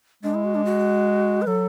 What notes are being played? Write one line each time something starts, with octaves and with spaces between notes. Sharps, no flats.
G#3 D4
E4
F#4
D4
F#4
B4
F#3 A4